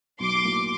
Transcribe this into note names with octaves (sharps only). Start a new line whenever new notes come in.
B1 C6 D6
A2 F#3 A#3